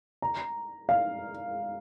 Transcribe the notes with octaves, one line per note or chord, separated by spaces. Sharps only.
A#5
F5